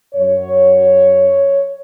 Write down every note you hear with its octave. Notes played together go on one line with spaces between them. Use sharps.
F#2 F#3 C#5